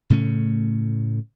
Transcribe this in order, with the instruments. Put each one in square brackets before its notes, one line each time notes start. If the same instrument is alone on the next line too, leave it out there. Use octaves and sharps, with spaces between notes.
[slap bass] A2 C#3 A3 C#4